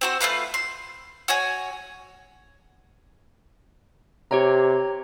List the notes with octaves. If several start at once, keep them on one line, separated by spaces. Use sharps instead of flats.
C4 F#4 C5
A3 D#4 F4 B4
C6
F#4 C#5 G#5
C3 G4 C#5 A#5